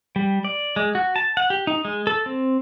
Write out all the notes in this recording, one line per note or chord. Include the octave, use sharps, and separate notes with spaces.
G3
D5
G#3
F#4
A5
F#5
G4
D#4
G#3
A4
C4